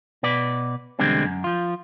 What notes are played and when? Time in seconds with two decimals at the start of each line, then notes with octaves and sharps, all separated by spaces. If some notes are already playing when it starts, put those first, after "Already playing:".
0.23 B2 B4 D5
0.99 E2 B2 D3 G3 G#3 C4
1.25 F#2
1.44 F3 F4